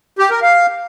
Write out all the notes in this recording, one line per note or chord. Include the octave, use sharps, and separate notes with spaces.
G4
A#4
F5